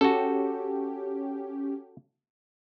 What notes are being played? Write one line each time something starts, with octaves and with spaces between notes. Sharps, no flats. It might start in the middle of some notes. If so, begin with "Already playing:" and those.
C#4 F#4 G4 A4